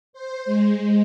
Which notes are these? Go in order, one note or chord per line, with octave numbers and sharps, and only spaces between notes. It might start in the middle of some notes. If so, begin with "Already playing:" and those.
C5
G#3